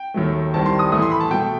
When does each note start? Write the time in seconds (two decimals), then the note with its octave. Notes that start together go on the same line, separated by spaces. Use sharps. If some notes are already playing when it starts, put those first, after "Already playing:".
Already playing: G5
0.14 D#2 D#3 F#3 A3
0.54 C2 C3 D#3 G3 A5
0.66 C6
0.79 D#6
0.92 A2 E3 A3 D#6
1.02 C6
1.12 B5
1.20 A5
1.30 B2 A3 G5